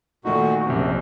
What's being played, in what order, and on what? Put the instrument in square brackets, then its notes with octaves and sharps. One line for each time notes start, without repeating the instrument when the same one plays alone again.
[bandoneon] A#2 F#4 [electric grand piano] D#3 A3 D#4
[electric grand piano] A#1 C3 [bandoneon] F#2